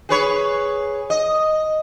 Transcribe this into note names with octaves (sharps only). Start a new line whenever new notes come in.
G#4 B4 C#5
D#5